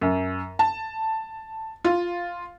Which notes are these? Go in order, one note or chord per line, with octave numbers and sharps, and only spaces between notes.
F#2
A5
F4